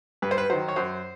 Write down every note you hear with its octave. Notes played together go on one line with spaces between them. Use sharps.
G2 B4
C5
B4
D#3 F#3 C5
C#5
F#2 C5